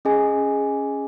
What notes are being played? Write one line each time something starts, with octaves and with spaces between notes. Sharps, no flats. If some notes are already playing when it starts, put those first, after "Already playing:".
C#4 G#4 D#5 G#5